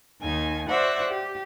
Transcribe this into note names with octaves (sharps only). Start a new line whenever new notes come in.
D#2 D#3 D#4 G#5
F#4 C5 D5 E5 F#5
G4